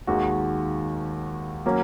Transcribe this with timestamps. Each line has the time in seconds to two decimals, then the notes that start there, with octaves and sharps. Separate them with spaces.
0.07 D#2 D#3 G#3 F#4
1.66 F#3 A#3 C#4 F#4